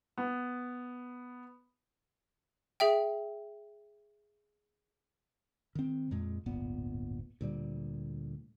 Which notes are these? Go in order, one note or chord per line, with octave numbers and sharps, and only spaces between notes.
B3
G#4 E5 G5
D#3 C4
F2 A#2 G#3
D1 G1 A#2 B3
D2 A#2 G3